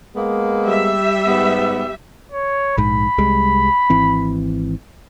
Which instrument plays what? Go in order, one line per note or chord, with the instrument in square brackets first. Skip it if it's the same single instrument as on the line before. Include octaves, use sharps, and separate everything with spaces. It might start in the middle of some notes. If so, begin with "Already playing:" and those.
[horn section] G#3 A#3 B3
[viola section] G3 E5
[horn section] G#2 B3
[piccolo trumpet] C#5
[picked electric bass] A#1 G#2 [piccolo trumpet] B5
[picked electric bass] C2 G3 G#3
G#1 E3 C4